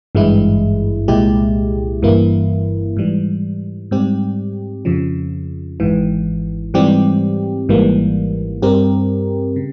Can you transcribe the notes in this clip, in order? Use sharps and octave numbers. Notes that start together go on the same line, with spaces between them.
G#1 G2 E3 G#3 E4
C2 A#2 G#3 E4 G4
G1 G2 E3 A#3 E4
G#2 E3 G3
G#2 G3 C4 G4
F2 C#3 F3
G#1 G#2 E3
G#2 E3 G3 C4 G4
G#1 G#2 E3 G3 A#3
G2 G3 C4 G4 A#4
C#3